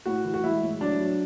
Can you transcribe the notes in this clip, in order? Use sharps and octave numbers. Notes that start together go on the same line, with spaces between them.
A2 F#4
E3
F#4
G#3 E4
A2
F#3 D4
F#3